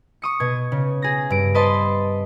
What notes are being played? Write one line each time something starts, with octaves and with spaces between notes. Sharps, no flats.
C#6 D#6 C#7
B2 G#6
C#3
G#4 A#6
G2 D7
B4 C5 D#5 A5 B5 C6